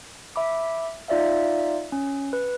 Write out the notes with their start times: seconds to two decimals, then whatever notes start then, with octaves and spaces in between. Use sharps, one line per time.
0.36 E5 B5 D6
1.08 D#4 F4 D5 E5 F5
1.92 C#4
2.33 B4